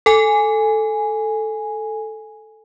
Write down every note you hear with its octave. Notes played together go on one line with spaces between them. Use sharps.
A4 G#5